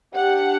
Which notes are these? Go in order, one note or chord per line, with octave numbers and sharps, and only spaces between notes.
D4 G4 F#5